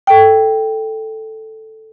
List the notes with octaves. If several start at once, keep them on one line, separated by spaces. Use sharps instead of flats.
A4 G5